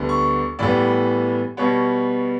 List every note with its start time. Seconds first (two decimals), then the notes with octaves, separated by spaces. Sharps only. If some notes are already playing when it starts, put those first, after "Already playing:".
Already playing: D2 D3 G3 B3
0.09 C#6
0.59 A2 E3 G3 B3 D5
1.57 B2 G3 B3 C#5